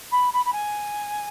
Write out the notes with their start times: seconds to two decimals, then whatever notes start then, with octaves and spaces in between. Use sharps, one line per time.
0.11 B5
0.32 B5
0.44 B5
0.52 G#5